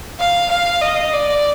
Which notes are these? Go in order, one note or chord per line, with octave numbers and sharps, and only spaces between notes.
F5
F5
D#5
D5